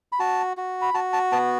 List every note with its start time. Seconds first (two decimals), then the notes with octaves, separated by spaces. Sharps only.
0.12 B5
0.19 F#4 A5
0.57 F#4
0.82 B5
0.94 F#4 A5
1.13 A5
1.32 B3 A5